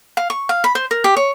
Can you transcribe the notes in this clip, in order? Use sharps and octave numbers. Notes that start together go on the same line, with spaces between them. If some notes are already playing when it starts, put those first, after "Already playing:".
F5
C#6
F5
B5
C5
A#4
G4
C#5